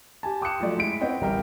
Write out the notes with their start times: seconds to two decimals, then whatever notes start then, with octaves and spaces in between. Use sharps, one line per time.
0.23 G4 G#5 A5
0.41 G5 D6 D#6 F#6 C#7 E7
0.60 F3 F#3 A3 D5
0.77 G#3 E4 B6 D7
1.01 B3 C4 C#5 D#5 G5
1.21 D1 A1 G3 A#4 E5 G5